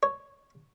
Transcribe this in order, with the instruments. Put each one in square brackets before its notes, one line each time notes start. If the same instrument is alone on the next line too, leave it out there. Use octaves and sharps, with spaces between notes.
[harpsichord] C#5